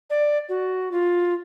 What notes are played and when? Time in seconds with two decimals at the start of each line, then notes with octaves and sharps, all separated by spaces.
0.10 D5
0.49 F#4
0.92 F4